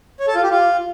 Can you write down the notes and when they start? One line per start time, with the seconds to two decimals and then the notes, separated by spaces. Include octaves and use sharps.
0.20 C#5
0.27 A4
0.35 F4
0.43 G4
0.50 F4